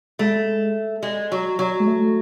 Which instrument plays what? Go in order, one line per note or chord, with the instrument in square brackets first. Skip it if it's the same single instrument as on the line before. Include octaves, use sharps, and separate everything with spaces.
[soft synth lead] G#3 [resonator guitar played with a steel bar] A3
[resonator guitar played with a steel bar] G#3
F#3
F#3
[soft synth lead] G#3
A3